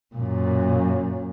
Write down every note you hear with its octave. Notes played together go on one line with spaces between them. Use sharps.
F#2 A#2